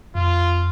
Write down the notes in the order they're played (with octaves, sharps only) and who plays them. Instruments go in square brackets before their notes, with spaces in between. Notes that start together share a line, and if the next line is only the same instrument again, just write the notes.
[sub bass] F2 [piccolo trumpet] F4